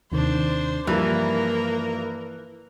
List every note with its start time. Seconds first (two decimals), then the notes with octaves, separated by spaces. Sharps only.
0.12 D#2 C3 D#3 D4 C5
0.87 G2 E3 F3 A#3 E4 A#4 F#6